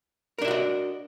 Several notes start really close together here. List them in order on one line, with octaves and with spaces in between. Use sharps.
A#4 D4 E5 F#4 D#5